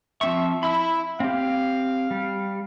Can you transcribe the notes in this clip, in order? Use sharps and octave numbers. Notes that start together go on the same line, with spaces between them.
F3 C4 E5 C#6
E4 B5 E6
C4 G4 F5
G3